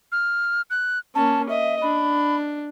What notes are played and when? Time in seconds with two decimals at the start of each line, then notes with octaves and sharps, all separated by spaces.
0.12 F6
0.70 F#6
1.15 A#3 C#4 A5
1.49 D#5 E5
1.82 D4 B5